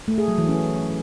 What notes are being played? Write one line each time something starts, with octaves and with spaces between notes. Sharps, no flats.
A3
G#4
F#3
E3
C#4